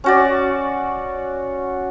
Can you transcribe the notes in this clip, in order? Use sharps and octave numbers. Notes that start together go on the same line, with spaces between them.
C#4 F#4 D5